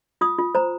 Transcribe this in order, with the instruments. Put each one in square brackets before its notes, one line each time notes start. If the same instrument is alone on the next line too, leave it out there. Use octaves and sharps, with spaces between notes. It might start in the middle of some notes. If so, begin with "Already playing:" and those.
[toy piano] F4 D#6
F4
C5 A#5